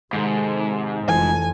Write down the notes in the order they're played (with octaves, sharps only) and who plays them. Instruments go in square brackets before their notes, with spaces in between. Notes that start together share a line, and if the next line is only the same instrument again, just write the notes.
[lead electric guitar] G#2 [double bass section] C3 G#3 [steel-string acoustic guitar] D#3 A4
[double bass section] F1 F3 [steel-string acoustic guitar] E3 A4 [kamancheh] G#5